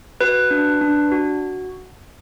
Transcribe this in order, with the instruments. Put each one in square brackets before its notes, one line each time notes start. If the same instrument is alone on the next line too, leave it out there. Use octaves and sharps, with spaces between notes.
[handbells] F#4 B4
D4
D4
F#4